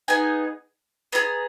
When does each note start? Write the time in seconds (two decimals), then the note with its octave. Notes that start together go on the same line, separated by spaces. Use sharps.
0.08 B3 D#4 G#4 G#5
1.12 B3 F4 G#4 A#5